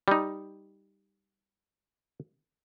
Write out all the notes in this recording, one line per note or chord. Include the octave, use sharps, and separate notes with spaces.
G3 D#4